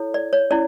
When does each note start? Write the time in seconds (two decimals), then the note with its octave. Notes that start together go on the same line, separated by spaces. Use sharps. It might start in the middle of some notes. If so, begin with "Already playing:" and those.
Already playing: E4 A4 C#5
0.14 D5
0.33 C#5
0.51 C#4 E4 D5